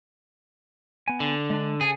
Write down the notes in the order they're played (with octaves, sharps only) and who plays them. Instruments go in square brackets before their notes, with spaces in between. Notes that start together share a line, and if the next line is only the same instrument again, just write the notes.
[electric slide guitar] B3 G#5
[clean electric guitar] D3
[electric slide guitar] G#3 D4
[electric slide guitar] C#3 A4 G#5 [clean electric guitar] G#4